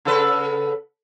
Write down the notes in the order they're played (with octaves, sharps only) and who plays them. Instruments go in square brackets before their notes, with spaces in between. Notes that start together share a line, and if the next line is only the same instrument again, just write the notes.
[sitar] C#3 A4 B4